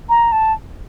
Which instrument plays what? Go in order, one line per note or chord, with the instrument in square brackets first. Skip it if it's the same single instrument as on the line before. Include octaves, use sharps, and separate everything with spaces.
[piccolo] A#5
A5